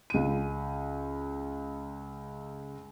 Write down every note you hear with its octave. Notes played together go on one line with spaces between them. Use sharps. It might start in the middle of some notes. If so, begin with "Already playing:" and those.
C#2 D#7